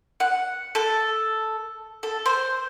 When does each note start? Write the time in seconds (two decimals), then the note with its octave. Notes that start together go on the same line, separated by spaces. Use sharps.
0.20 F#5
0.75 A4
2.03 A4
2.26 C5